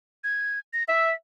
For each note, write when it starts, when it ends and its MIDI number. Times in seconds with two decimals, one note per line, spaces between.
0.24 0.59 92
0.73 0.84 94
0.88 1.10 76
0.88 1.14 95